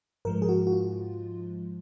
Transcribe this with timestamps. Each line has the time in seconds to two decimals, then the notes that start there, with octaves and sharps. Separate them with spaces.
0.25 G#2 F3 G#3 A#4
0.42 G#4
0.49 F#4
0.67 F#4
0.72 F4